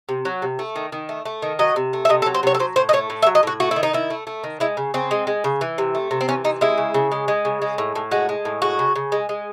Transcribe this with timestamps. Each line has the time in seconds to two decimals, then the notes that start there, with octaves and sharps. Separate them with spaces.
0.09 C3
0.25 F#3
0.42 C3
0.59 A3
0.76 D#3
0.92 D#3
1.09 A3
1.25 A3
1.42 D#3
1.59 F#3 D#5
1.76 C3
1.93 A3
2.05 E5
2.09 C3 D#5
2.22 A4
2.26 F#3
2.35 C5
2.43 C3 C#5
2.54 A4
2.59 F#3 C5
2.76 A2 C5
2.89 D#5
2.93 A3 C#5
3.10 A2
3.22 E5
3.27 F#3
3.35 D#5
3.43 A2 F#4
3.60 A3 F#4
3.71 E4
3.76 D#3
3.83 D#4
3.93 D#3 E4
4.10 A3
4.27 A3
4.44 D#3
4.60 G#3 E4
4.77 C#3
4.94 C#3 C4
5.11 G#3
5.27 G#3
5.44 C#3
5.61 E3
5.78 C3
5.95 A3
6.11 C3
6.21 C4
6.28 E3 C#4
6.44 C3 D#4
6.61 G#3 E4
6.78 C#3
6.94 C#3
7.12 G#3
7.28 G#3
7.45 C#3
7.62 G#3
7.78 A2
7.95 A2
8.11 G#3 F#4
8.29 G#3
8.45 A2
8.62 G#3 F#4
8.79 C#3
8.96 C#3
9.12 G#3
9.29 G#3